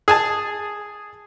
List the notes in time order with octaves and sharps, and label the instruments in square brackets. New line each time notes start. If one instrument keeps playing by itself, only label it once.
[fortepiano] G#4 G#5 A5